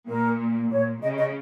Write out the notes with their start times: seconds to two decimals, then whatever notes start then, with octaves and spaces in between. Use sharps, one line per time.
0.09 A#2 A#4
0.72 A#2 C#5
1.02 C#3 D#5
1.18 D#5